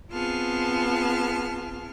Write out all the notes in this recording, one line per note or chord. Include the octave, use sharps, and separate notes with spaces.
B3 C4 F4 G#4 A5 F6